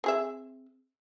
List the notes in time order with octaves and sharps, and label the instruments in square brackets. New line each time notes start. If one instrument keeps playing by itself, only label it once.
[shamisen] C4 G#4 E5